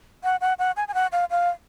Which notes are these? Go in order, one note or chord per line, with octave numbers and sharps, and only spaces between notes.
F#5
F#5
F#5
G#5
G#5
F#5
F5
F5